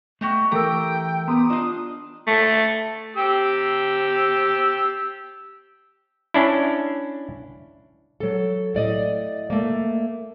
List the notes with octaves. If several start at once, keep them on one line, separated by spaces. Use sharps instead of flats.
A3 F#4 G4 D#5
E3 A3 G4 A4 A#4 G5 A#5 E6
B3 G4 A#5 C6 D#6
D4 F4 D#5 F5
A3
G4 E6
C#4 D4 E4
F#3 A4
A2 D5 D#5
A3 A#3